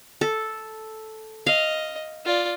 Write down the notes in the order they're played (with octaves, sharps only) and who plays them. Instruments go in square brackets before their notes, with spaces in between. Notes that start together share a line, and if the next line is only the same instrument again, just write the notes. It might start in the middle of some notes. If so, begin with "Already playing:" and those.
[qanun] A4
[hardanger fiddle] D#5 [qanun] F5
[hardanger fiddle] F4 D5